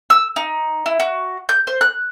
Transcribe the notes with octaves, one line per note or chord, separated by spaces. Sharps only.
E6
D#4
E4
F#4
G6
C5
F#6